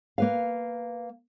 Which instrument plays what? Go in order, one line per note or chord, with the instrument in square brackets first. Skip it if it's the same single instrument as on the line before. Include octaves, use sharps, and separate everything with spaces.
[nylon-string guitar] A#3 B4 F5